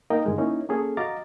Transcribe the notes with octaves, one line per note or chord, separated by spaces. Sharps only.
A#3 D#4 A#4 D#5 F5 G5
G2 D3 D#3 G#3
A#3 C#4 D#4 E4
A#3 C#4 G#4 A4
F#4 D#5 F5 A#5 D6 A6